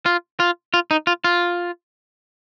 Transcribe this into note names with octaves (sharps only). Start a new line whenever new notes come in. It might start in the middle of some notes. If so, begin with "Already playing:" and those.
F4
F4
F4
D#4
F4
F4